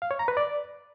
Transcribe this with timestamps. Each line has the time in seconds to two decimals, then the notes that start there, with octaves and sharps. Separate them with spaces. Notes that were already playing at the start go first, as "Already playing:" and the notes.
0.02 F5
0.11 C#5
0.19 A#5
0.28 B4
0.37 D5